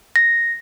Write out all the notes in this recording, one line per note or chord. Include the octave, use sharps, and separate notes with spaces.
A#6